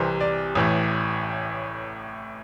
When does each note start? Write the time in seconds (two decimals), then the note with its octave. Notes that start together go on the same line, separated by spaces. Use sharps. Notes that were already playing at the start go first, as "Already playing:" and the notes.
Already playing: C2 C3 E3 C5
0.20 D5
0.55 A1 A2 E3